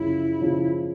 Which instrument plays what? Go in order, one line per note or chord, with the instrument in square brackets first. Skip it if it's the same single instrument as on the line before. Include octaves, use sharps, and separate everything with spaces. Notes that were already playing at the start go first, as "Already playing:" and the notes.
Already playing: [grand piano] F#2 C#3 F3 [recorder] E4
[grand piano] C#3 F3